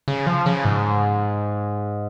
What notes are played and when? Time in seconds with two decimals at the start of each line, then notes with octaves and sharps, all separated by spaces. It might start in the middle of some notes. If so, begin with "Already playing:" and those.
0.08 C#3
0.27 F3
0.46 C#3
0.65 G#2